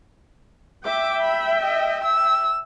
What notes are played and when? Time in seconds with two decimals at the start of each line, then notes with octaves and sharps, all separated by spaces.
0.85 E5 G5 D6
1.22 B5
1.60 D#5
2.05 E6